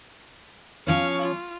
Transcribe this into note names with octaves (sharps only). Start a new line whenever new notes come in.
F3 C#4 C#5 F5 C#6
F4